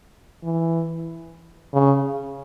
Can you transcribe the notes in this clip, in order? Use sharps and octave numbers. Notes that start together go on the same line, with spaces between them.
E3
C#3